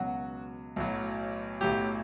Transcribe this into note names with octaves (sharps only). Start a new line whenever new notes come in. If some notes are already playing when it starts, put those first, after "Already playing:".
Already playing: C#2 B2 F#3 F#4
B1 A2 F#3
B1 A2 F#3 G4